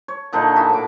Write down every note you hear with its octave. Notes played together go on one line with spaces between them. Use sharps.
C#5
A#2 D3 D4 D#4
E4 F#4 G#4 E5
A2 D6